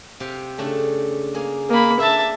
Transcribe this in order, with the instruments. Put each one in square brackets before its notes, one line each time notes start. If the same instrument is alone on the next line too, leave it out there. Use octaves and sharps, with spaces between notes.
[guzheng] C3 G4 F5
C#3 A3 D4
A#3 G#4
[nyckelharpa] A#3 B5 [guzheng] D#5
[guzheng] A#3 D4 [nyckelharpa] E5 A5